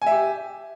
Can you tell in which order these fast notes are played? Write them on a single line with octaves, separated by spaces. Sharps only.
G#5 E5 G4